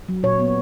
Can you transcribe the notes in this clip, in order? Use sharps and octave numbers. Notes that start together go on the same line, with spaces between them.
F#3
A#2 C#5
B3